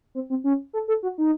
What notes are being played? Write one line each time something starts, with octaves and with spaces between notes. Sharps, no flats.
C4
C4
C#4
A4
A4
F#4
D#4